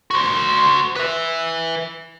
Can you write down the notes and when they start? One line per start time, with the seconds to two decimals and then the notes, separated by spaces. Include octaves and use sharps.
0.11 F#4 C5
0.96 B4 E5